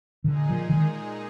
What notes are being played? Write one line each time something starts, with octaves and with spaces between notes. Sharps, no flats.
A#2 D3 G#3 D#4 G#4
F3
D3
D#3